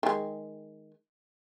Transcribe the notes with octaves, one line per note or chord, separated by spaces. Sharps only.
D#3 G#3